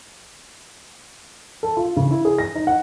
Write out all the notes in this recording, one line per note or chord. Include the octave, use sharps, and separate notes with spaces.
A4
F4
C#3
E4
G#4
A#6
D#4
F#5